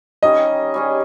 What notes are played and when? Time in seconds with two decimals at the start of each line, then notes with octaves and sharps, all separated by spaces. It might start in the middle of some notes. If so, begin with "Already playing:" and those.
0.22 D#3 G3 C#4 D#5
0.74 G3 C#4 G#4